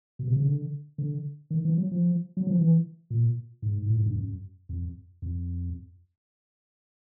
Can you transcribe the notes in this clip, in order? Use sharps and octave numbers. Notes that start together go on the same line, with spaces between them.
B2
C3
C#3
D3
D3
D#3
E3
F#3
F3
F#3
F3
E3
A#2
G#2
A2
G#2
G2
F#2
F2
F2